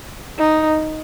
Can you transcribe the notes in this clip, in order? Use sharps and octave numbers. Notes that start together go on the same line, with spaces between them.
D#4